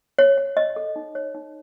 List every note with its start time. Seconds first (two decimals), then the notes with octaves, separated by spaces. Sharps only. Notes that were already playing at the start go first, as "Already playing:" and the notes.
0.19 C#5
0.38 C#5
0.57 C#5 D#5
0.76 A4
0.96 D#4
1.15 C#5
1.35 D#4